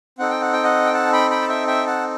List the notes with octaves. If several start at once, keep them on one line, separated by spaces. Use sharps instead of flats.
C4 D#4 A4 F#5
G5
F#5
G5
D#5 F#5
G5
F#5 A5
G5 B5
G5 B5
A5
E5 G5
E5 G5
F#5 A5